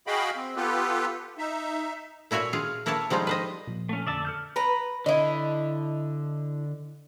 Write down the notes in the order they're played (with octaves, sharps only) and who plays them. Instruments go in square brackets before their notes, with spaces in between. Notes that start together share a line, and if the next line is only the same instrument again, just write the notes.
[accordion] F#4 G#4 D#5 F5 G5 B5
C4
B3 F4 G4 A4 B4
D#4 E5
[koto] A#2 E4 F#4 C#5 G#5
F4 G#4 F5
A#3 E4 B4 C#5 A5
F3 G3 G#3 D#4 F4
B4 C5 D#5
[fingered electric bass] A#2 F3
[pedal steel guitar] A3 C#4
[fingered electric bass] F2 D3 [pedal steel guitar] D5 E5 A5
[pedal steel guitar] A4 F6 G6
[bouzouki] B4 A#5
[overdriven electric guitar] D3 [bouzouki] E4 D#5